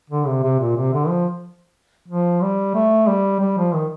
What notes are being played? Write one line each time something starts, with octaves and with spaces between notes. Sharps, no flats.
D3
C3
C3
A#2
C3
D3
F3
F3
G3
A3
G3
G3
F3
D#3